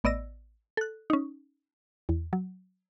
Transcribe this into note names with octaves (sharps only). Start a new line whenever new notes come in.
A1 B3 D5 D#5 E6 A#6
A4 F#6
C#4 D#4
E2
F#3